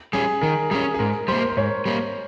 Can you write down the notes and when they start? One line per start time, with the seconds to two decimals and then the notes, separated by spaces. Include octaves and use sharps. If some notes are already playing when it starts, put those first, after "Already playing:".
0.13 G3 C#4 G#4
0.41 D#3 A#4
0.71 G3 C#4 G#4
0.94 G#4
0.99 G#2 A#4
1.28 G3 A#3 C5
1.42 A#4
1.49 C5
1.57 G#2 C#5
1.86 G3 A#3